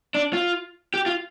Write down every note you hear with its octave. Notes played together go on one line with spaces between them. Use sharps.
D4
F4
G4
F4